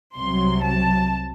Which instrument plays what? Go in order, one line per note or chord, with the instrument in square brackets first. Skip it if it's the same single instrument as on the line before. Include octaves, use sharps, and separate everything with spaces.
[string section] C2 C3 F#3 C6
A5